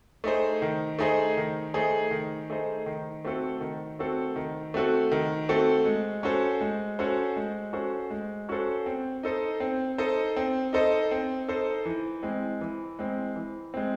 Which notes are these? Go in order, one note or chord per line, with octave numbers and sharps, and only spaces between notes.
A3 D#4 G#4 C5
D#3
A3 D#4 G#4 C5
D#3
A3 D#4 G#4 C5
D#3
A3 D#4 G#4 C5
D#3
A3 C4 F#4 A4
D#3
A3 C4 F#4 A4
D#3
A3 C4 F#4 A4
D#3
A3 C4 F#4 A4
G#3
C#4 F#4 A4 C5
G#3
C#4 F#4 A4 C5
G#3
C#4 F#4 A4 C5
G#3
C#4 F#4 A4 C5
C4
D#4 A4 C5 D#5
C4
D#4 A4 C5 D#5
C4
D#4 A4 C5 D#5
C4
D#4 A4 C5 D#5
E3
G#3 C4
E3
G#3 C4
E3
G#3 C4